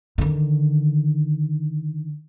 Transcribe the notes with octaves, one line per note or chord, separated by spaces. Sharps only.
D3 D#3